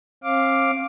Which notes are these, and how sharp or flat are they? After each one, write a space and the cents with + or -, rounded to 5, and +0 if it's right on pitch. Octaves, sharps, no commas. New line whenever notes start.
C4 +45 F5 +0 D6 +0